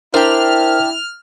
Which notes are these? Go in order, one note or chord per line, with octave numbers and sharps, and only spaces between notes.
D4 E4 G4 A#4 C5 F6